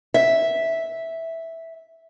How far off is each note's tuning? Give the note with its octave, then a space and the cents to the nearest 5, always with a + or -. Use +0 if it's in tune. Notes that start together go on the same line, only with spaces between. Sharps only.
E5 -5